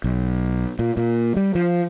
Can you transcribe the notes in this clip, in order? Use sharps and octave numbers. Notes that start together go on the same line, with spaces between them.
B1
A#2
A#2
G3
F3